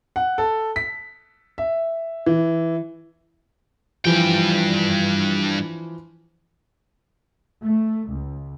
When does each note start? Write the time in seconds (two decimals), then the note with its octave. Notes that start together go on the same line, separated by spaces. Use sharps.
0.16 F#5
0.38 A4
0.76 B6
1.58 E5
2.26 E3
4.05 G2 E3 F3 G5
7.62 A3
8.08 C#2